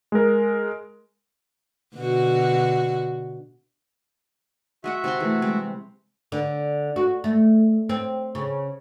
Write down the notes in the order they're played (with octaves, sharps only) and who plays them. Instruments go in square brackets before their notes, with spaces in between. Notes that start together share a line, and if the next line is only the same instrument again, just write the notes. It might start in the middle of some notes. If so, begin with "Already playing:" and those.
[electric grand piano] G#3 A#4
[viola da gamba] B2 D3 F#4
[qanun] G#3 D#5 F#5 [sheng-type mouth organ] F#4 E5
[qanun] C3 C5 C6 [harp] C4
[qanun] E3 [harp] A3 G#4
[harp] G3 G#3 [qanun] C4
[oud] D3
F#4
A3
C4
C#3